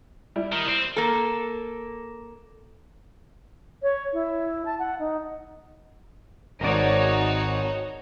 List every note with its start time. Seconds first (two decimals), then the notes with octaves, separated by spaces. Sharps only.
0.36 G3 E4
0.52 D#3
0.68 C4
0.96 A#3 A4
3.83 C#5
4.13 E4
4.66 A5
4.79 F#5
4.99 D#4
6.61 D#1 G#1 D#4 F#4 A#4 C#5 D5